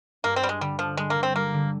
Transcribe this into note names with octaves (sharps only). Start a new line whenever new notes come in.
G2 A#3
C4
G3 D4
G#3
D3 G3
F3 D4
G3 G#3
A#3
D3
C4
G3 A#3
D3